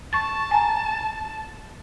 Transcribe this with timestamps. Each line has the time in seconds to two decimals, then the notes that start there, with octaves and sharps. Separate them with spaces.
0.13 A5 C#6 A6
0.51 G#5 A#5